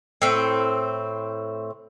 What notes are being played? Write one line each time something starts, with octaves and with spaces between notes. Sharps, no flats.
A2 C4